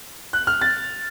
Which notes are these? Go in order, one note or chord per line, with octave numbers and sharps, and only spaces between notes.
F#6
F6
A6